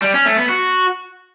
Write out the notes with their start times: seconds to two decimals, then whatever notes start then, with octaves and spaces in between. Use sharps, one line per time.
0.02 G3
0.14 C#4
0.26 A3
0.38 B3
0.49 F#4